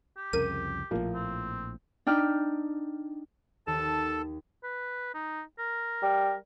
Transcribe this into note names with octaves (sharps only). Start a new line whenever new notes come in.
G4
C2 F2 C#3 A#4 D#7
A#1 A2 F3 A#3
C4
D4 D#4 G5 F6
D#2 A4 A5
B4
D#4
A#4
G3